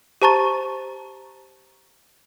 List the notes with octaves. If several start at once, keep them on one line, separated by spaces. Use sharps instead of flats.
G4 C5 A5 A#5 C#6 A6